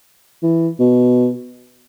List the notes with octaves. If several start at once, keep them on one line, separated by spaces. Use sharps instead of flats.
E3
B2